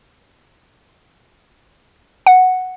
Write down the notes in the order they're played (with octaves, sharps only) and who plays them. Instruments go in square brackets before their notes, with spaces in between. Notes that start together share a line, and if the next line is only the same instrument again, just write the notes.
[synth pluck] F#5